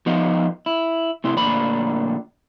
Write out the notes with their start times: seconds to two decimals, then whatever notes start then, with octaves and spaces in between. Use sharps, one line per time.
0.06 F3 B3 D#4 F4
0.66 E4
1.24 A2 C3 E4 C6
1.37 D2 A#2 D4 D5 B5